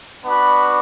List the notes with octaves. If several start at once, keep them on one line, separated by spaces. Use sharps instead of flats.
B3 D4 F#4 B5